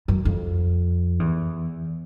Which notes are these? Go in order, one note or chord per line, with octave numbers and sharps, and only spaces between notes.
F#2
F2
E2